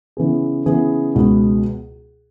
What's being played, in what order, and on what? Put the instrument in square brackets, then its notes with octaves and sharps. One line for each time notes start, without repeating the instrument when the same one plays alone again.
[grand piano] C#3 E3 B3 G#4
C#3 E3 B3 G#4
C#2 B2 B3